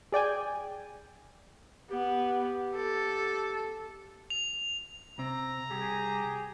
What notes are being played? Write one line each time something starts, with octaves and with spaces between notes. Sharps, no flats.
G#4 D5 G5 G#5
B3 G4
A4
F7
C3 C4 A#5
C2 G4 G#4